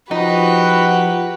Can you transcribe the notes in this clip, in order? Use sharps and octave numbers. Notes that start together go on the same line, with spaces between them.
F3 D#4 F#4 G4 B4